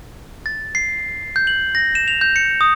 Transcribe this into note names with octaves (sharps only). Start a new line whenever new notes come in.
A6
C7
G6
F#7
A#6
E7
F7
G6
C#7
D#6